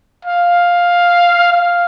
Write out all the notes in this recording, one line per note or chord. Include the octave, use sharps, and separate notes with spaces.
F5
F5